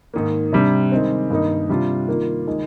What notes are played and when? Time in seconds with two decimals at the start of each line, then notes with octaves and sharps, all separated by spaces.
0.14 G#2 D#3 A#3
0.52 C3 G3 D4
0.92 D#3 G#3 C4
1.30 G2 D#3 A#3 D#4
1.69 C3 G3 D4 F4
2.08 D#3 A#3 F4
2.47 D#3 G#3